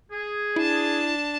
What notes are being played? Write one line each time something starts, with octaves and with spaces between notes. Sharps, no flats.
G#4
D4 E4 A5